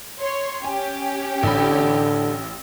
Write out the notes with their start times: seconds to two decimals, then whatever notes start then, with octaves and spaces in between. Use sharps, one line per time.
0.20 C#5 C6
0.65 C#4 G4 G#5
1.43 A1 D3 B5